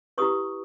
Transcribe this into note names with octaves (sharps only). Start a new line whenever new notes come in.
E4 G4 B4 C#6 D#6